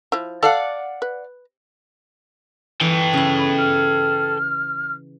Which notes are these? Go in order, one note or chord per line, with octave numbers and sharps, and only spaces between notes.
F3 E4
A4 D5 F5 F#5 A5
B4
E3 A4 G5
C#3 E4
B5
F6